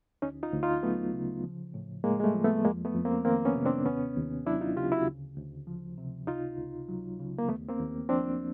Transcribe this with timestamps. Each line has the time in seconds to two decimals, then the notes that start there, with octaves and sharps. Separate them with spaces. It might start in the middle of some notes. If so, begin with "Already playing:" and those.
0.22 D2 C#4 D#4
0.43 D#4 F4
0.53 D2
0.63 D#4 F4
0.83 F#3 A3 B3
1.14 C#3
1.44 F3
1.74 A2
2.04 A2 G#3 A#3
2.20 G#3
2.24 G3 A3
2.34 F3
2.44 A3 B3
2.64 F2 G#3 A#3
2.85 A3 B3
2.95 F2
3.05 A#3 C4
3.25 D#3 A#3 C4
3.45 B3 C#4
3.55 C3
3.65 C4 D4
3.86 D#2 B3 C#4
4.16 D#2
4.46 F#3 D4 E4
4.61 D#4 F4
4.76 C#3 F4 G4
4.92 E4 F#4
5.07 D2
5.37 D2
5.67 F3
5.98 C3
6.27 C#2 D#4 F4
6.58 C#2
6.88 F#3
7.19 C#3
7.38 A#3
7.49 D#2 A3 B3
7.69 A#3 C4
7.79 D#2
8.09 F3 C4 D4